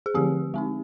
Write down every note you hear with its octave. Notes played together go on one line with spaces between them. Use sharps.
G#4
D3 F3 A3 C4 G4
G#3 C4 D#4